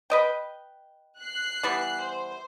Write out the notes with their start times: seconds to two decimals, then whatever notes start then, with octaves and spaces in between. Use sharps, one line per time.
0.10 B4 D#5 G5
1.20 F#6 C7
1.63 E3 G3 B3
2.02 C5